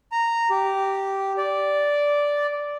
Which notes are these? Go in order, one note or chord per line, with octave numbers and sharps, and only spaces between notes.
A#5
G4
D5